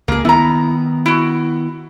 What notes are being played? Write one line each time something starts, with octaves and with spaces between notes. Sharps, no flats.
C#2 A#3 G#4
D#3 B3 E4 A#5
E4 F#4